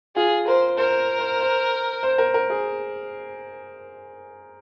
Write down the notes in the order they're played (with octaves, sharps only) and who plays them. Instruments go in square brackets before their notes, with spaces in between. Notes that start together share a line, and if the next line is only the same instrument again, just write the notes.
[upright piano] F4 [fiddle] G#4
[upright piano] A#4 [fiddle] C5
[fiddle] A#4 [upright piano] C5
[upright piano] C5
C5
C5
A#4
A#4
G#4